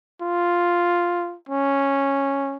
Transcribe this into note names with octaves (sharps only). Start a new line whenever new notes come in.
F4
C#4